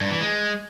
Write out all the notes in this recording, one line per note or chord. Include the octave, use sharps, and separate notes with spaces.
G2
E3
G#3